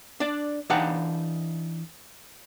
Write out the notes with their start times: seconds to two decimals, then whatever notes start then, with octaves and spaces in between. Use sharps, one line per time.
0.20 D4 D5
0.70 E3 D4 D#4 G4 F5 F#5